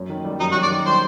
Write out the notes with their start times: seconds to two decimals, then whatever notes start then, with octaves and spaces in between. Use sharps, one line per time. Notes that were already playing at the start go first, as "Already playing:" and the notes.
Already playing: F#2
0.10 D#3
0.25 G3
0.40 F#2 D#4
0.52 F#4
0.55 F#2
0.63 D5
0.71 D#3
0.86 G3 C5